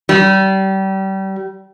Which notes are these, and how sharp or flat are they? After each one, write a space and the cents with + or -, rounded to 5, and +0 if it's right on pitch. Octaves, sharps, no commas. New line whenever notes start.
G3 -30